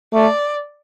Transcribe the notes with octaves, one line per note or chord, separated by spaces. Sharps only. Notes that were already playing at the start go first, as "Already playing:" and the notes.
A3 D5